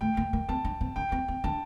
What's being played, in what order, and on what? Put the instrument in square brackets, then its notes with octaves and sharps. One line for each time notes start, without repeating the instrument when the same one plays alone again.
[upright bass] A3 [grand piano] G5
[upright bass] A#3
A#3
[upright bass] C4 [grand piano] A5
[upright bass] D4
C4
[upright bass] D4 [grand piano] G5
[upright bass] C4
C4
[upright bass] D4 [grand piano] A5